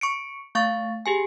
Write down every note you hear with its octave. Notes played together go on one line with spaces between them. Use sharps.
C#6 C#7 D7
A3 F5 C#6 A6
G4 G#4 G#5